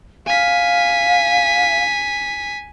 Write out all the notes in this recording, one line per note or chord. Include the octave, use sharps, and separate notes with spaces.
F5 G#5 B6